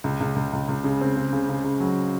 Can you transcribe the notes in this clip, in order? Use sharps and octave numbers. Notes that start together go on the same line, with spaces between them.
C#2
C#2
C#2
C#2
C#2
C#3
C4
C#3
C#3
C#3
C#3
F#3